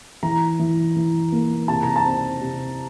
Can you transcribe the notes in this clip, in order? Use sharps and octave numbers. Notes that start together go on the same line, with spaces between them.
E3 A#5
E3
E3
A#3
C3 A5
A#5
A5
C4
C3